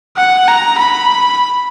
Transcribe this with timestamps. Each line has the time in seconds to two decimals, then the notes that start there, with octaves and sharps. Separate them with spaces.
0.17 F#5
0.48 A#5
0.78 B5